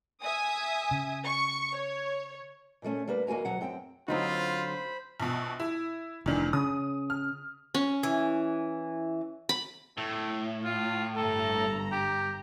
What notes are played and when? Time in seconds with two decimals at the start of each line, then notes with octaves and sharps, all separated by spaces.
0.22 E5 G#5 D#6
0.91 C#3
1.24 C#6
1.73 C#5
2.82 A#2 C#3 G3 A3 C#4
3.08 G3 A#3 D4 B4
3.27 D#2 A#3 F#4 G#5 A#5
3.45 D2 B2 F#3 F#5
3.61 F#2 C4 G5
4.08 D3 F#3 C4 D#4 F4 C5 B5
5.20 A#1 B2
5.60 E4
6.26 F1 C#2 D#3 E3 D4
6.53 C#3 D#6
7.10 F6
7.75 C#4
8.03 E3
9.49 B5
9.98 A2 A3
10.64 F4
11.16 G1 G2 A4 A#5
11.92 G4